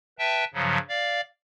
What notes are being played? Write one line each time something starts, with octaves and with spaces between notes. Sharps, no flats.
B4 E5 G5 A5
G2 C#3 F3 F#3
D5 F5